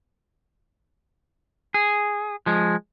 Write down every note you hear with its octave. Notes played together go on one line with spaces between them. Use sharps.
G#4
F3 G#3